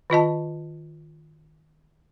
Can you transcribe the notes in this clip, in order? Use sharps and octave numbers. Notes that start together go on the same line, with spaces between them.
D#3 F4 D#5 A5